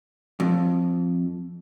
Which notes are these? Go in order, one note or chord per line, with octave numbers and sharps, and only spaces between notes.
F2